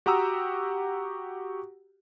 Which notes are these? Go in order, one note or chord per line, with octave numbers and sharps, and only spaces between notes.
F#4 G4 F#5 A#5 D#6 E6